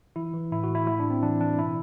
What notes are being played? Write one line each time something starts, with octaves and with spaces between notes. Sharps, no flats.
E3 E4
E3
A2 E4
F#4
A2
E4
A2 E4
D4
A2
C4
E3 D4
E3 D4
B2 E4